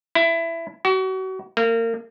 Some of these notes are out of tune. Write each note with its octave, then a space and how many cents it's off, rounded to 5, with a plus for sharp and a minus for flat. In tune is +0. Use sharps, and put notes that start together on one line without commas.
E4 +15
F#4 +35
A#3 -30